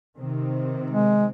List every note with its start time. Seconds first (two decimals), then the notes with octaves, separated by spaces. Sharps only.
0.17 C3 D#3 C4
0.90 G#3